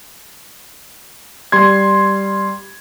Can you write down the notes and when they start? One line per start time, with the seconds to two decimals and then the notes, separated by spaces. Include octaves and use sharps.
1.52 G3 C6 G#6